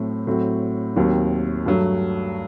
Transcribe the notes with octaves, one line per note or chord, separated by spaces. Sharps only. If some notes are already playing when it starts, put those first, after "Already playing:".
Already playing: A2 F#3 A3 C4
A2 F#3 C4 F#4
D#2 D#3 F#3 C4
G2 F#3 A3